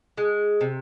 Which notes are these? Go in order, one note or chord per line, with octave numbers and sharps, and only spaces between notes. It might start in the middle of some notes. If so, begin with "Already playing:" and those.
G#3
C3